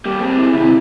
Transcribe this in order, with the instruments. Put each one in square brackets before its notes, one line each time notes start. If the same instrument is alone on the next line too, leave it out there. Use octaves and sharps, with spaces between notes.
[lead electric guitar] G3 A#3 [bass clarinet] G4
[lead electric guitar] C4 G#4
[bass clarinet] E4
[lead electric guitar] D#2 C3 [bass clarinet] E4